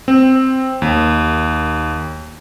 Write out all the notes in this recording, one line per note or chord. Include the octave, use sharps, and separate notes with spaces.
C4
D#2